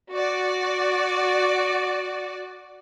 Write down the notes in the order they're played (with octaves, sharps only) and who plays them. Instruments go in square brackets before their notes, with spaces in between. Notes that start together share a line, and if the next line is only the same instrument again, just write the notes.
[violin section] F#4 D5